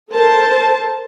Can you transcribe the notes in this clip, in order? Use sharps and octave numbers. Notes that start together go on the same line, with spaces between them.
A4 A#4 C5 A5